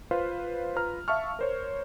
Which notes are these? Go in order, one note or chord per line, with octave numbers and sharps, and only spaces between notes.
F4 B4 C5 F5
F4 B4 A#5 F6
E5 F5 A5 C#6 F6
A#4 C5 C#5